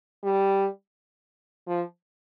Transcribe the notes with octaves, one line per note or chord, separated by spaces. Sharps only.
G3
F3